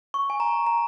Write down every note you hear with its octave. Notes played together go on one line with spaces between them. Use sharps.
C#6
G#5
A#5
A#5